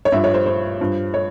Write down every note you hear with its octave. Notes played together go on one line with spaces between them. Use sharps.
C#5
G2 F3 E5
C#5
C5
C5
G2 F3
C#5